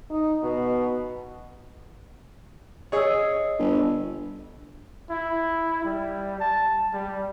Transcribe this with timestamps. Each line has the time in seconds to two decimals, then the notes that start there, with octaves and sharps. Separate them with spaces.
0.10 D#4
0.43 B2
2.92 G#4 C#5 D#5 E6
3.59 G1
5.10 E4
5.85 G3
6.40 A5
6.93 G3